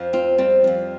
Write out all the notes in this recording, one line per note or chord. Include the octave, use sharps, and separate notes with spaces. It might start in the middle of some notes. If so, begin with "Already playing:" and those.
Already playing: F2 F3
C4 F4
G3 C4
F2 F3